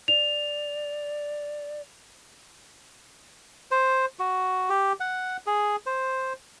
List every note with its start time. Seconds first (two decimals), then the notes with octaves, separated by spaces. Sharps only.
0.08 D5 F7
3.71 C5
4.19 F#4
4.69 G4
5.00 F#5
5.46 G#4
5.86 C5